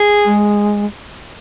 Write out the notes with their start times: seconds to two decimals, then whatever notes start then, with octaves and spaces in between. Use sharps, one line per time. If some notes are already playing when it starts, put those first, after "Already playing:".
Already playing: G#4
0.25 G#3